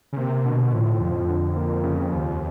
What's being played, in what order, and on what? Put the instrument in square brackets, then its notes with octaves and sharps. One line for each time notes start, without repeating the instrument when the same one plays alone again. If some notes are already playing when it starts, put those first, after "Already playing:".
[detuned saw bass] C#3
[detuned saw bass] C3 [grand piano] A#3
[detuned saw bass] B2 [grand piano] D3
[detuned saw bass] A2 [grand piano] F3
[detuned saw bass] F2 [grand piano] F3
[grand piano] D3
A#3
C#3
D#2